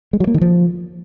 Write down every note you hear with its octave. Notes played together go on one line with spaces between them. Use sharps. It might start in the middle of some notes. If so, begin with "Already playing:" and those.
G#3
F#3
A#3
D#3
F3